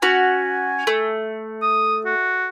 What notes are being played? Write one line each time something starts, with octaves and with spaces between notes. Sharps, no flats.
C#4 F#4 G#5
A3
D#6
F#4